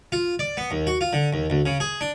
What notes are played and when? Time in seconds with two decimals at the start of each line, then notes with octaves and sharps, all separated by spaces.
0.12 F4
0.39 D5
0.57 B3
0.71 D#2
0.87 F#4
1.01 F4
1.13 D3
1.33 D#2
1.50 D2
1.66 C#3
1.80 G#4
2.01 D4